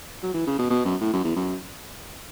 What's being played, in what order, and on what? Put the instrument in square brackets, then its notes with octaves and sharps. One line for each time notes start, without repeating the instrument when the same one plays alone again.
[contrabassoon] F#3
E3
C#3
B2
B2
F#2
A2
F#2
E2
F#2